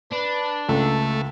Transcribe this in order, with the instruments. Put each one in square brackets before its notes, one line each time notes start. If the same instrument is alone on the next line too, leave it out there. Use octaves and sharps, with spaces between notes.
[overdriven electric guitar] D4 [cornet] B4
[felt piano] C#2 [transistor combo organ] A3 [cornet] A4